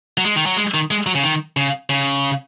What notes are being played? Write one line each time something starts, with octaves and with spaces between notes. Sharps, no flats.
F#3
G#3
D#3
F#3
G#3
D#3
G#3
F#3
C#3
D#3
C#3
C#3